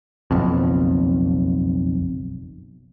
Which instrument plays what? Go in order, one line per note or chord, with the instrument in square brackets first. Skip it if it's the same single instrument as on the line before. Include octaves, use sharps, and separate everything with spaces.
[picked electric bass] F#1 B1 F2